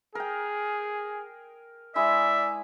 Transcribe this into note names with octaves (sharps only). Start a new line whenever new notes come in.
G#4 A#4 G5
G#3 E4 G#4 D5 E5